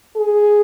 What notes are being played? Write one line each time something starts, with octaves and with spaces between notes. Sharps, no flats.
G#4